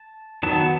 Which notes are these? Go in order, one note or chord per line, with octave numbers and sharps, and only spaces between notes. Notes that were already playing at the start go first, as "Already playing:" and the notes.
Already playing: A5
D#3 F#3 B3 A5